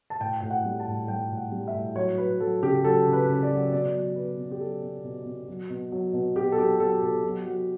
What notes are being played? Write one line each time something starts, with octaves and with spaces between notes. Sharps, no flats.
A5
A2 G5
A2 G5
F#5
G3
A5
A2
G3 G5
A2
F#5
G3
E5
A2
F#3 C#5
F#3 B4
F#3 A4
C#3 G4
F#3 A4
C#3
B4
C#3
D5
F#3
B2 D5
F#3
B2 B4
B2
G4
F#3 A4
B2
B2
B2
F#3
B2
F#3
B2
B2 G4
A4
F#3 G4
F#3 A4
B2 A4
F#3 G4
F#3 F#4